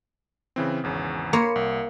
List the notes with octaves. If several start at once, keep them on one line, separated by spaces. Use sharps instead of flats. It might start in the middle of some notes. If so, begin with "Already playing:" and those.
C#3 E3 C4
G#1 E2 C#3
A#3 C#5 B5 C6 C#7
C2